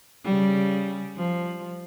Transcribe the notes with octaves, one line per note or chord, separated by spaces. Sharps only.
C#3 G3
F3